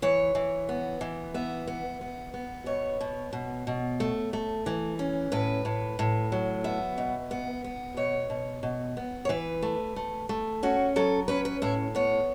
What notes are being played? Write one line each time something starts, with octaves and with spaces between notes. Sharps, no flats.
E3 C#5
E3
B3
E3
B3 E5
B3
B3
B3
B2 C#5
B2
B2
B2
A3
A3
E3
C#4
A2 B4
A2
A2
F#3
B3 E5
B2
B3
B3
B2 C#5
B2
B2
B3
C#5
E3 B4
A3
A3
A3
C#4 F#4
F#3 A4
C#4 B4
B4
A2 E4
B3 C#5